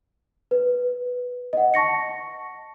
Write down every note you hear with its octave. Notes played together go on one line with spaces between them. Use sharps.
B4
D#5 F#5
A5 C#6 A#6 C#7